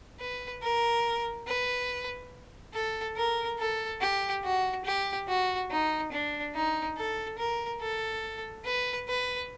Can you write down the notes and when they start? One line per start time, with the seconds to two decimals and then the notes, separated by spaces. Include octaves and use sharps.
0.20 B4
0.62 A#4
1.47 B4
2.74 A4
3.17 A#4
3.59 A4
4.01 G4
4.44 F#4
4.85 G4
5.28 F#4
5.70 D#4
6.12 D4
6.55 D#4
6.97 A4
7.38 A#4
7.80 A4
8.65 B4
9.08 B4